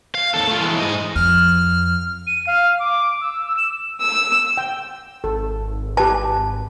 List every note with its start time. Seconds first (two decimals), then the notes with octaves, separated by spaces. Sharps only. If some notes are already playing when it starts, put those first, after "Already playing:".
0.15 F5
0.34 D#2 A4
0.48 A3 F4
0.61 E3 G#3
0.80 G#2 D#5
1.15 F2 F6
2.27 D#7
2.47 F5
2.79 D6
3.21 E6
3.44 E6
3.57 E7
4.01 E6
4.57 G5
5.24 G#1 A4
5.97 G4 B4 A5